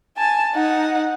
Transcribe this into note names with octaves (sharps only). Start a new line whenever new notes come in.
G#5 A5
D#4 F#5